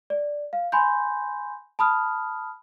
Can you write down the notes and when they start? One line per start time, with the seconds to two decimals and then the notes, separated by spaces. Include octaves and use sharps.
0.10 D5
0.53 F5
0.72 G#5 B5 C6 G6
1.79 A5 B5 D#6 F6